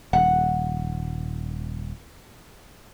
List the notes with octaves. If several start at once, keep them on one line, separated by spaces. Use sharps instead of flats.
D#1 F#5